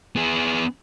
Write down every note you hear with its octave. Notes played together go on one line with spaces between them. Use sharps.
B3 G#4